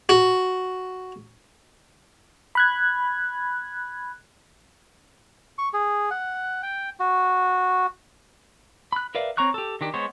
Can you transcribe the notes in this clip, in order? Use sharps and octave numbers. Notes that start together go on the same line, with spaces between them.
F#4
B5 F#6 G#6
C#6
G#4
F#5
G5
F#4
B5 F#6
A#4 B4 D5 E5 F5
C4 C#5 A#5 C#6 F#6
G4 A4
D#3 D4 G4
G#3 B3 C5 C#5